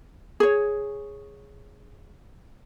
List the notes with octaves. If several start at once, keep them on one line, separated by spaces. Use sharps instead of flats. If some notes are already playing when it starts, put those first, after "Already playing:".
G#4 C#5